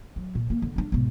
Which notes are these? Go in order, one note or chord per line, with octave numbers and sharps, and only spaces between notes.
F#3
A#2
D3 A#3
D3
G3 D4
G#1 B2